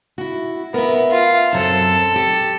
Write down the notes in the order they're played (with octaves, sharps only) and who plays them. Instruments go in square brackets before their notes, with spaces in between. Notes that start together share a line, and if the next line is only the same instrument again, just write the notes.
[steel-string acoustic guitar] E4 F#4
[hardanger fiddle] B3 [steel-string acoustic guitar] A#4 E5
[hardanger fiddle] F4
[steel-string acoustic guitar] F#2 F#3 C4 [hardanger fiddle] A4
[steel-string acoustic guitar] G4